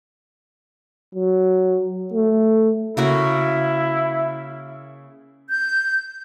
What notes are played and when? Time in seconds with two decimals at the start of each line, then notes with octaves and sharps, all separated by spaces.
1.15 F#3
2.14 A3
2.97 C#3 A#3 E4 F#4
5.50 G6